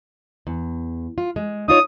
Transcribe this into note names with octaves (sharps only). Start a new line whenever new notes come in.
E2
F4
G#3
D#4 F4 C#5 D#6